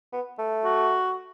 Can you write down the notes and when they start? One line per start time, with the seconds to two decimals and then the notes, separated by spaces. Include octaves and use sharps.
0.12 B3
0.39 A3
0.65 F#4